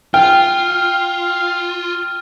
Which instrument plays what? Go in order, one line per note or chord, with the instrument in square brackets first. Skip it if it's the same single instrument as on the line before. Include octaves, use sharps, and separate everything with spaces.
[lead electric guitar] F4 [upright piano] G5 [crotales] F6